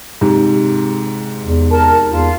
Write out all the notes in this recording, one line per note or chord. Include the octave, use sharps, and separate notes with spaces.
G#2 C3
E2
A#4 A5
E2 F4